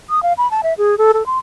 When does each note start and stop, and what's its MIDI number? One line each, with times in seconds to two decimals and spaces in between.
0.10 0.23 87
0.23 0.33 77
0.38 0.50 83
0.51 0.61 81
0.63 0.74 76
0.78 0.98 68
0.98 1.12 69
1.14 1.26 69
1.26 1.39 84